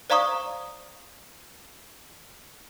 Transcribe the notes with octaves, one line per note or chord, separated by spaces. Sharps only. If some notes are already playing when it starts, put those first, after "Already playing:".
C5 D5 F5 A#5 C#6 D#6